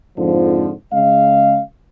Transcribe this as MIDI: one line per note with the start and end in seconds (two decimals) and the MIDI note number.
0.18 0.71 41
0.18 0.71 44
0.18 0.71 50
0.18 0.71 53
0.93 1.61 49
0.93 1.61 56
0.93 1.61 75
0.93 1.61 77